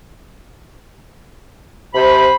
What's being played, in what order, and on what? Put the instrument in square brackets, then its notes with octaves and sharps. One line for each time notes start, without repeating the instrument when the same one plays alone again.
[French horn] C3 [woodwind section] C5 B5